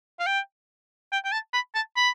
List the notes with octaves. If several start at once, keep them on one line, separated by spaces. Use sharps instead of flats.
F5
G5
G5
G5
A5
B5
A5
B5